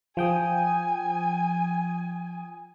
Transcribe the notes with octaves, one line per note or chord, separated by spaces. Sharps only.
F3 G5 G#5 D#6